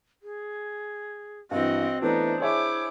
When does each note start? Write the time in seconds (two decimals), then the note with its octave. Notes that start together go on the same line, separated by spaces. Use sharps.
0.23 G#4
1.51 G2 E3 C4 F#4 D#5
2.02 E3 A3 B3 D4 D#4 C5
2.40 E4 G#4 C#5 E5 D6